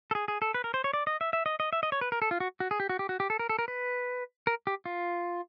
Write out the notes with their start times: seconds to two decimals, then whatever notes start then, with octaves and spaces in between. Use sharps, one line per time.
0.11 A4
0.15 G#4
0.28 G#4
0.42 A4
0.54 B4
0.64 A#4
0.74 C5
0.84 C#5
0.94 D5
1.07 D#5
1.21 E5
1.33 E5
1.46 D#5
1.60 D#5
1.73 E5
1.83 D#5
1.92 C#5
2.01 B4
2.12 A#4
2.22 A4
2.31 F4
2.40 F#4
2.60 F#4
2.71 G#4
2.80 G4
2.89 F#4
2.99 G4
3.09 F#4
3.20 G4
3.30 A4
3.39 A#4
3.49 A4
3.59 A#4
3.68 B4
4.47 A#4
4.67 G4
4.86 F4